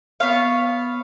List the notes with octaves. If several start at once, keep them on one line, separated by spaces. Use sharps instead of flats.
B3 C#5 F5